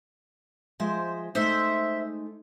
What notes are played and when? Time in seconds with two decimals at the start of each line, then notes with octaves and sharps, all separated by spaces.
0.80 F3 G#3 C5 E5
1.35 G#3 A3 D#4 C5 E5